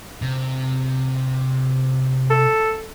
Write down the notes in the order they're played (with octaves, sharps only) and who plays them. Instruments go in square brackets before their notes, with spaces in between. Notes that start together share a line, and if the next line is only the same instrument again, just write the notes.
[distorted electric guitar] C3
[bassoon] A4